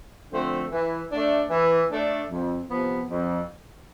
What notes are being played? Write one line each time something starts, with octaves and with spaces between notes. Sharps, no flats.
D3 F3 A3 C4
E3
D4
A3
E3
A3 D4
F2
C3 F3 B3
F2